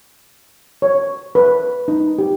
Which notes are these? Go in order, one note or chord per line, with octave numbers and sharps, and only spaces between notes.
C#5
B4
D#4
G4